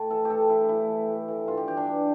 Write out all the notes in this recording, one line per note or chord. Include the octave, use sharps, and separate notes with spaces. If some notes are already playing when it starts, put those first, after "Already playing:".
Already playing: A2 G5 A5
E3 A4
A2 G4 A4
E3 E4
A2 E4
E3
A2
E3
G2 F4
G4
E3 G4
D4
G2